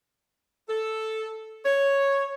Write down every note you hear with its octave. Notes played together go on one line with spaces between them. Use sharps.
A4
C#5